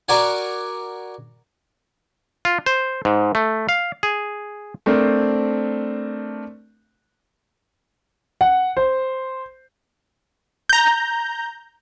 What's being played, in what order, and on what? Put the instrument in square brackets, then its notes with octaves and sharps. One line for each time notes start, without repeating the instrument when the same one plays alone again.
[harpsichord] F#4 A#4 D5 F#5 G#5
[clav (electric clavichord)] F4
C5
G#2
A3
F5
G#4
[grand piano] A3 C4 D4 A#4 C5
F#5
C5
[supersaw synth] A#5 G6